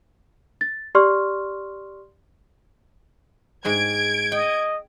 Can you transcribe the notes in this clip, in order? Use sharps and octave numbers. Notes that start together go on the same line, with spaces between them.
A6
G4 D5 C6 C#6 F6
G#2 G#3 G5 G#6 D7
D#5 G5